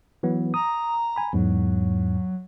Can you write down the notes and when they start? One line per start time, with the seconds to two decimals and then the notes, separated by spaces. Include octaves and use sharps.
0.23 E3 F#3 B3
0.54 A#5 D#6
1.16 G#5 B5
1.33 E2 G#2 F#3